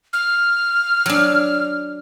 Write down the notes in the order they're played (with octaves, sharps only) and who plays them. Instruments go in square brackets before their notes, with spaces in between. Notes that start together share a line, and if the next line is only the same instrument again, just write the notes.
[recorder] F6
[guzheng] F#3 D4